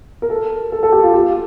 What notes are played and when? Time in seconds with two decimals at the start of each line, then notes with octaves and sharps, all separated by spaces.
0.22 A#4
0.30 A4
0.72 A4
0.83 A4
0.92 G4
1.03 F4
1.14 G4